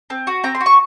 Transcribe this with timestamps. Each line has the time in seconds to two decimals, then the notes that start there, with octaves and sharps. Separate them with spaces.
0.10 C4
0.27 F#4
0.44 C4 A#5
0.55 C6
0.60 F#4
0.66 C#6